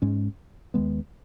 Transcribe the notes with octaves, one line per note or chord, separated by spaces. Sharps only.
G#2 G#3 C#4
D#2 D#3 G#3 B3